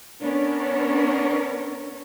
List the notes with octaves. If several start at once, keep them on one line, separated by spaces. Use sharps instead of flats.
B3 C#4 D4 A#4 C#5